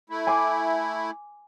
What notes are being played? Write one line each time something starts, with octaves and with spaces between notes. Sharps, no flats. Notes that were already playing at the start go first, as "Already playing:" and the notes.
A3 E4
G#5 C6 D6